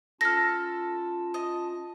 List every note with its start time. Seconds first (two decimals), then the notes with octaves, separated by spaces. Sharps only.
0.21 C#4 F4 A4 A5 F6 A#6
1.34 D#5